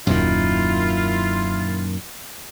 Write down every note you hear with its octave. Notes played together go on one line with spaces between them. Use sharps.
D#1 F#2 A#2 D#3 E4 F4